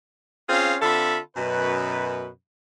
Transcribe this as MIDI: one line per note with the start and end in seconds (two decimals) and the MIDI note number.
0.50 0.77 60
0.50 0.77 61
0.50 0.77 65
0.50 0.77 68
0.50 0.77 77
0.82 1.19 50
0.82 1.19 60
0.82 1.19 65
0.82 1.19 69
0.82 1.19 76
0.82 1.19 83
1.36 2.29 42
1.36 2.29 47
1.36 2.29 71